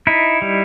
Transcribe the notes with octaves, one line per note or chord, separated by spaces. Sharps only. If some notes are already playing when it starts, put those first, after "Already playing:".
D#4 E4
G3